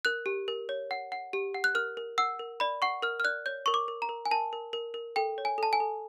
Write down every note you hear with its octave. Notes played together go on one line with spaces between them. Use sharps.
A#4 F#6
G4
A#4
C#5
F#5
F#5
G4
F#5
F#6
A#4 F6
A#4
F#5 E6
A#4
D5 B5
F#5 C#6
A#4 F6
F6
D5 F#6
C#5 G6
A#4 C#6
D6
A#4
A#5
A#4
G#5
A#4 A5
A#4
A#4
A#4
A4 G5
C#5
G#5
A4 A5
G#5
A4